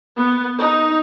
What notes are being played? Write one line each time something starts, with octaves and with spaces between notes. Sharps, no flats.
B3
D#4